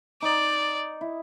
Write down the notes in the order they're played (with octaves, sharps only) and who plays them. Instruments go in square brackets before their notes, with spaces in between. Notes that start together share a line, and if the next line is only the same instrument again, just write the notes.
[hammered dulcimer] D#4 [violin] D5
[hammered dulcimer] E4